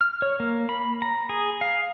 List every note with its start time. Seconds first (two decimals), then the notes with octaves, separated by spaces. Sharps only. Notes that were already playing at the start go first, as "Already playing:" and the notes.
0.01 F6
0.22 C#5
0.40 A#3
0.69 B5
1.02 A#5
1.29 G#4
1.61 F5